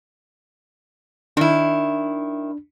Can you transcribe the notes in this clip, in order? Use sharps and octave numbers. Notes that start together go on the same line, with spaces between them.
D#3 D4 E4